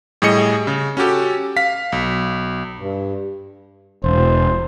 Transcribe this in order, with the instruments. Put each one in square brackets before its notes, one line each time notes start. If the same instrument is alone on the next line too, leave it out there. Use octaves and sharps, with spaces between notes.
[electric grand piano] A2 G3 G#4 D#5 C#7
C#3
C#4 F#4 G4 A4
F5 B6
B1
[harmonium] G2
[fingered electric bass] E1 [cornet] C5